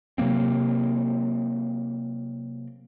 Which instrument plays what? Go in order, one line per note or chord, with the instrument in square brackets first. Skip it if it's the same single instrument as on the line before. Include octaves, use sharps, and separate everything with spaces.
[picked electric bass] C3 F#3 A#3 C4